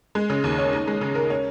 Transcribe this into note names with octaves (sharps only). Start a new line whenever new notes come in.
G#3
C#3
D#2
C#4
D#4
G#3
C#3
A#4
C#4